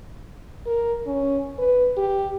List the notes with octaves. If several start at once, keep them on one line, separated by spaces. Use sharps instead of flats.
A#4
C#4
B4
G4